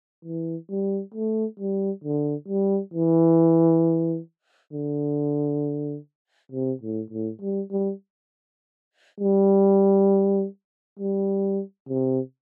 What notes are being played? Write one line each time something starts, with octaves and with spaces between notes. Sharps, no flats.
E3
G3
A3
G3
D3
G3
E3
D3
C3
A2
A2
G3
G3
G3
G3
C3